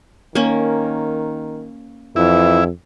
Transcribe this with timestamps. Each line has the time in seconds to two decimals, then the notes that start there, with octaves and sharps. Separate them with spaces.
0.35 D#3 A#3 C#4
2.16 F2 E3 E4